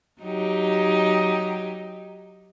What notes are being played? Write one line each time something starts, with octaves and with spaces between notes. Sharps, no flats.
F#3 D#4 G4